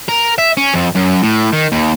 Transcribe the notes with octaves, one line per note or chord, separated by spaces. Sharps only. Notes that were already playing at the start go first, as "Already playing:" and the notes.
A#4
E5
C#4
F2
F#2
A2
D#3
D#2